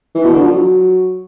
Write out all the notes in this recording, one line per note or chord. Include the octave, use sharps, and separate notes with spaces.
E3
B2
D3
F3
F#3